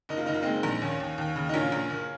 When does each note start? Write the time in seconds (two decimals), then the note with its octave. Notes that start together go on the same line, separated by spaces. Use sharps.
0.09 F#1 D#4
0.17 F4
0.26 F#1 D#4
0.34 F4
0.42 G#3 C4 D#4
0.63 A#1
0.82 D#2 C#4
1.00 D#2
1.18 D#2
1.36 C#3
1.49 D#4
1.54 A#1 C#4 F4
1.72 A#1
1.90 F#1